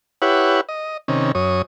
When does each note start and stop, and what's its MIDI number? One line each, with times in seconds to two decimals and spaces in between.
0.22 0.61 64
0.22 0.61 67
0.22 0.61 71
0.22 0.61 73
0.22 0.61 78
0.69 0.97 75
1.08 1.32 48
1.08 1.32 51
1.08 1.32 61
1.35 1.62 42
1.35 1.62 73
1.35 1.62 87